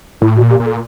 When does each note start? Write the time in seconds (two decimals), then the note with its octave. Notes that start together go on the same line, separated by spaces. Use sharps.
0.21 A2 E4
0.37 F#4
0.41 A#2
0.50 G4
0.60 A#2
0.66 A4